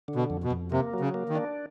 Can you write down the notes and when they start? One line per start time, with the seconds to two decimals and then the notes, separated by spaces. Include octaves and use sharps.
0.08 D3
0.16 B2
0.30 F2
0.44 B2
0.51 F2
0.72 C3 A#3
0.93 F#3
1.00 C#3
1.14 A#3
1.29 D#3
1.36 D4